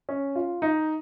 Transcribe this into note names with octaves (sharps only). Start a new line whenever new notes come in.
C#4
F4
D#4